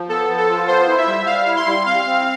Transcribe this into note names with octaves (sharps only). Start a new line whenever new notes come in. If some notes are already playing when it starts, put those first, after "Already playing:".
Already playing: F3
B3 A4
F3
A4
F4
B3 C5
E4
E5
G3
G3 F5
E4
C6
G3
C4 F5
C4